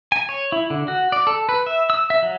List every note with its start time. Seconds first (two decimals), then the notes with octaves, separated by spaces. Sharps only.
0.12 G#5
0.29 C#5
0.52 E4
0.70 D3
0.88 F#4
1.12 D5
1.27 A4
1.49 B4
1.66 E5
1.90 E6
2.10 E5
2.23 F#3